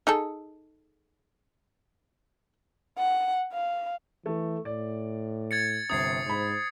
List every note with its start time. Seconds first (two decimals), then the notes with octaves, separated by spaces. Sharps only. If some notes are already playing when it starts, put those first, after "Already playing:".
0.07 D#4 G#4 A4
2.98 F#5
3.53 F5
4.26 E3 A3
4.65 A2 D5
5.51 G#6 A6 C#7
5.90 G1 C3 D#6 G#6 C7
6.26 G#2 C5 B5